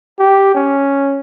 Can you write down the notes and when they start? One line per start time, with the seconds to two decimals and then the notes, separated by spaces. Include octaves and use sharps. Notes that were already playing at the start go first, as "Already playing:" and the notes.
0.19 G4
0.55 C#4